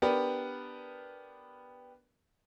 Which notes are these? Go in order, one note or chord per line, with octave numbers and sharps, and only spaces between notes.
B3 D4 G4 A#4 B4